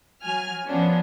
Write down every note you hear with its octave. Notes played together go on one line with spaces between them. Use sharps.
F#3 G#5 F6
F3 B3 C#4 D4